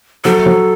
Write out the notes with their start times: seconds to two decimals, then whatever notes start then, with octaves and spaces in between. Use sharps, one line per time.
0.25 F#3 A4
0.46 F#3